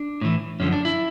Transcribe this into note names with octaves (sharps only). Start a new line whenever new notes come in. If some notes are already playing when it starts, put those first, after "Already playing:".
Already playing: D4
A2 E3
F#2 D3 F3 C#4
D4
E4